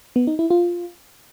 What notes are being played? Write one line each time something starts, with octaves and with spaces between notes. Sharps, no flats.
B3
D#4
E4
F4